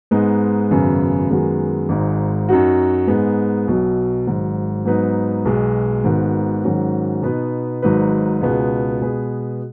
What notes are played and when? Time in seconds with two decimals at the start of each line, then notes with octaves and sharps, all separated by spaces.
0.11 G#2 G#3 B3 D#4
0.71 G#1 F#2 C#3 B3
1.29 F#2 D#3 G#3 B3 F#4
1.89 G#1 G#2 G#3 D#4
2.49 F#2 F#3 D#4 F#4
3.07 G#2 G#3 B3 D#4
3.67 B1 B2 F#3
4.27 G#1 G#2 F#3
4.85 G#2 F#3 B3 D#4 B4
5.45 B1 B2 G#3
6.04 G#1 G#2 D#3 B3 F#4
6.64 G#2 D#3 F#3 C#4 F#4
7.23 B2 B3 D#4 B4
7.82 G#1 G#2 F#3 D#4 B4
8.41 C#2 B2 B3 G#4
9.01 B2 G#3 B3 G#4 B4